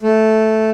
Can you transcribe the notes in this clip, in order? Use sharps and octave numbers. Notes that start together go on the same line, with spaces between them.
A3